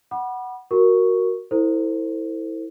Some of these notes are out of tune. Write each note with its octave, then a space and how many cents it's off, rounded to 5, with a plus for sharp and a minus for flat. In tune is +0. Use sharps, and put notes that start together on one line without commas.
F#5 +10 B5 -25 D6 +45
F#4 +0 A#4 +0 C#6 +0
E4 -15 A4 +35 C5 +0